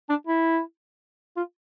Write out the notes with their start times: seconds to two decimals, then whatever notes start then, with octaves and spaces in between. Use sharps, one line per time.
0.10 D4
0.27 E4
1.37 F4